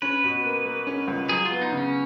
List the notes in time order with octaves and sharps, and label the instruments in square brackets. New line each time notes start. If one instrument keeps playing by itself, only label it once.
[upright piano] C#4 [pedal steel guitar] B4
[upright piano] B2
A#3
A#3
C#4
C#2
[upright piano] F#3 [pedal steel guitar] G#4
[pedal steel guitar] F4
[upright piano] B3
[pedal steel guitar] D#4
[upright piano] C#3 [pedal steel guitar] C#4